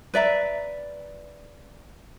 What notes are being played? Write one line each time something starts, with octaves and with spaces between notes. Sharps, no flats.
B4 D5 E5 A#5